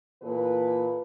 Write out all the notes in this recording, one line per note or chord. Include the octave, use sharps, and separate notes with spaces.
A#2 E3 A#3 A4 B4